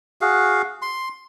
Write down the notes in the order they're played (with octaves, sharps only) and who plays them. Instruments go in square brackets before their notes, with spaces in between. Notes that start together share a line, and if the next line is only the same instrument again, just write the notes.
[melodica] F#4 G#4 F5
C6